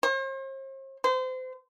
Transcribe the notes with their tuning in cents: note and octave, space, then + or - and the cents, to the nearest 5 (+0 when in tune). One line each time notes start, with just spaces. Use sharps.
C5 +45
C5 -30